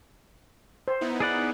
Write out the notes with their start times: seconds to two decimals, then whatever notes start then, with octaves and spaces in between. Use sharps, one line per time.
0.88 C5
1.01 B3 D#4 E4
1.20 G#4 D5 F#5